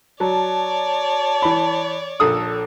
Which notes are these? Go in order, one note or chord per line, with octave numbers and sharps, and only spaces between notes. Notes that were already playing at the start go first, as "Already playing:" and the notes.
F#3 C#5 D5 A5
E3 B5
A#1 A4 D#6